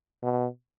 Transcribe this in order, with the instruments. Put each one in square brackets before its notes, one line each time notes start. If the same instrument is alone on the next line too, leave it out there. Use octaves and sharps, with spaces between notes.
[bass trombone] B2